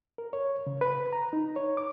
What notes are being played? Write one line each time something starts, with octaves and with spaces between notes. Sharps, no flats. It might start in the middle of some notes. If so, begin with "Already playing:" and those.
A#4
C#5
C#3
B4
A#5
D#4
C#5
D6